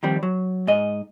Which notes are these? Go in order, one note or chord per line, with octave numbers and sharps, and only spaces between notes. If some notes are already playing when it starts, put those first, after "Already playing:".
D#3 F3 G3 C4
F#3
G#2 D#5